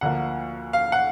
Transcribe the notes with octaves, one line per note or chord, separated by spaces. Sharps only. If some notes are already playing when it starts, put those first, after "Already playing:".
D2 D3 F3 A#3 F#5
F5
F#5